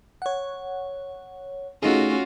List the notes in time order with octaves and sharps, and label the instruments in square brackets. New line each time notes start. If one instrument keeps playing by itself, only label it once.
[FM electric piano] C#5 F#5
[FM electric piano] A3 D#4 G#4 [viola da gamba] C#4 F4 F#4